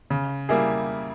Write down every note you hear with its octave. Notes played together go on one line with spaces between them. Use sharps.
C#3
G3 A#3 E4 G#4